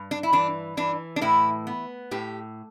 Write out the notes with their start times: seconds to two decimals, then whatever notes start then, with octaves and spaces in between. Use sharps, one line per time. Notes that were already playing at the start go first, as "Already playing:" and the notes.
Already playing: G2
0.11 D4
0.23 E4
0.33 E3 D4
0.77 E3 D4
1.16 D4
1.21 A2 E4
1.67 B3
2.11 A2 G4